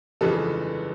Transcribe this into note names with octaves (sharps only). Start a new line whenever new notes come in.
G1 F2 C#3 E3 G#3 A4 B4